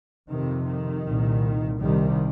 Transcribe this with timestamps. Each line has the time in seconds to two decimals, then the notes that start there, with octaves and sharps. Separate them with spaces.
0.29 F2 C3 D#3
0.67 D#3
1.05 C2 A#2
1.80 C2 C3 D#3 G3